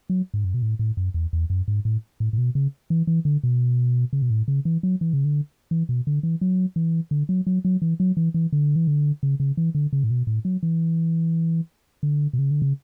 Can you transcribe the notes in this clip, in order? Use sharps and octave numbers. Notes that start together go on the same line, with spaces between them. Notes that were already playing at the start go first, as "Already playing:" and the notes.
F#3
G#2
F#2
B2
A2
A2
F#2
E2
E2
F#2
G#2
A2
A2
A2
B2
C#3
E3
E3
D3
B2
C#3
B2
A2
C#3
E3
F#3
E3
C#3
D3
E3
B2
D3
E3
F#3
E3
D3
F#3
F#3
F#3
E3
F#3
E3
E3
D3
E3
D3
C#3
C#3
E3
D3
C#3
A2
B2
A2
F#3
E3
D3
B2
C#3
D3
C#3